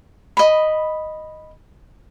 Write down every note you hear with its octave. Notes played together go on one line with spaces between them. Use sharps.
D#5 B5